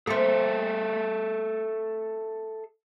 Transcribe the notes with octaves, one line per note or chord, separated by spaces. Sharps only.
A#3 C4 G#4 A4 E5